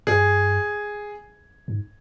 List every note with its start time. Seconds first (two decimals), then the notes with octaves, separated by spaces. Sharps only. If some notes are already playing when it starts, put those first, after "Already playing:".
0.07 G2 G#4
1.68 G#2